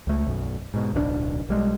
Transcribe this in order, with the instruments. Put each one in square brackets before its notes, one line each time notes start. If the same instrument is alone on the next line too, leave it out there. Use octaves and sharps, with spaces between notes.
[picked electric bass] C#2 A3
B1 F#2
G#2 B2
D1 B1 C#3 D4
B1 G3 G#3